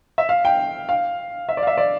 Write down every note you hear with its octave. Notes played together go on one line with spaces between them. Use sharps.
E5
F5
G5
F5
E5
D5
F5
E5
D5